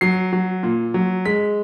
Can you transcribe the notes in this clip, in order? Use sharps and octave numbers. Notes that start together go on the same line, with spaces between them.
F#3 C7
F#3
A#2
F#3
G#3 B6